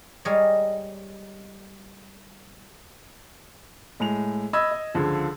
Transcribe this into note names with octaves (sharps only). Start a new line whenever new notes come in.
G3 G#3 A#4 C#5 D#5
A2 G#3 F7
D#5 B5 E6 G#6
D#5
C#2 D3 F3